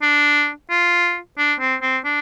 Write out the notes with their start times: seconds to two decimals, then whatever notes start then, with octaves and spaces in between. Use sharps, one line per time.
0.02 D4
0.70 F4
1.38 D4
1.60 C4
1.82 C4
2.05 D4